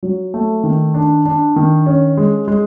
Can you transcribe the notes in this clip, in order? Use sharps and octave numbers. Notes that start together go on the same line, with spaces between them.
F#3
A3
D#3
D4
D4
D#3
C#4
G#3
G#3